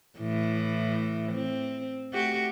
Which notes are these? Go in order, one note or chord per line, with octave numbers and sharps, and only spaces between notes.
A2 E3
C4
A3 F#4 G4